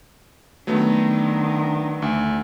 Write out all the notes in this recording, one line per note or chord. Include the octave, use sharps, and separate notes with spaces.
D#3 F#3 A3 B3 D4
D2